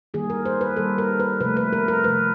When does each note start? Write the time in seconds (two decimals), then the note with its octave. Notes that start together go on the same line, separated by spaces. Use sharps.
0.14 D#3 G3 A#3 G#4
0.30 A#4
0.45 C5
0.61 B4
0.76 D#3 G3 A#3 A4
0.98 A#4
1.20 B4
1.40 C3 F3 A3 B4
1.57 B4
1.73 A#4
1.88 A#4
2.04 C3 F3 A3 B4